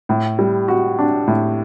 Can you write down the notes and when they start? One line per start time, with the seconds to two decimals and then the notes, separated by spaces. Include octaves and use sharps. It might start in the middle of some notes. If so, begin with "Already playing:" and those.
0.09 A2
0.39 G3
0.68 F#4
0.99 D4
1.27 A2